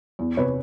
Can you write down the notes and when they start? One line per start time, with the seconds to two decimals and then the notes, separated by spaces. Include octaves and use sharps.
0.19 E2
0.37 C3 B4 C#5